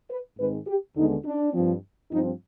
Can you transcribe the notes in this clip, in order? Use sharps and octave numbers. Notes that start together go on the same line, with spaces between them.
B4
G#2 D#3 G#3 C4 B4
G4
D#2 D3 G#3 B3 D#4
D4
G2 F3 C4
G2 F3 C4 D#4